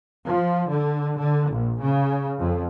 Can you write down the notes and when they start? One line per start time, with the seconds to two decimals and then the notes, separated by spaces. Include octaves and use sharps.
0.25 F3
0.68 D3
1.18 D3
1.50 A#1
1.81 C#3
2.38 F2